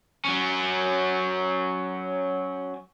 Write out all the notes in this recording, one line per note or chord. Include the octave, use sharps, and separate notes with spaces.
F#3 C#4